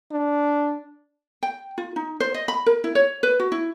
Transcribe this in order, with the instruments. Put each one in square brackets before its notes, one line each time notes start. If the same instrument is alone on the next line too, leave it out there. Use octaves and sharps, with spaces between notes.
[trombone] D4
[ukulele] G5
F4
D#4
C5
D#5
B5
A#4
E4
C#5
B4
F#4
E4